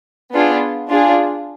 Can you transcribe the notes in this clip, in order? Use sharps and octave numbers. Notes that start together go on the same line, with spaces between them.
B3 D4 F4 G#4
D4 F4 G#4